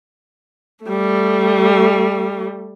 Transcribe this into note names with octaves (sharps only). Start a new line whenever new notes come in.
G3 A3